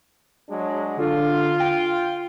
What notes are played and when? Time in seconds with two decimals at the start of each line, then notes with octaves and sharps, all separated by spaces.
0.49 F#3 G#3 D4
0.98 D3 F4
1.60 G5